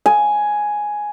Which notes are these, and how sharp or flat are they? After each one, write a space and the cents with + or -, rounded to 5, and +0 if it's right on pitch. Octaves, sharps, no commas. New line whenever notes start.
G#5 +5